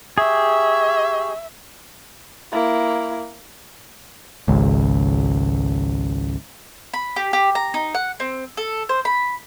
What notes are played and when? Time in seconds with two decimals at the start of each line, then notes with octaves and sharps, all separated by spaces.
0.18 G4 G#4 E5 C#6
2.52 A#3 E4
4.48 G#1 C#2
6.93 B5
7.16 G4
7.33 G4
7.55 A#5
7.74 D#4
7.95 F#5
8.20 C4
8.57 A4
8.89 C5
9.05 B5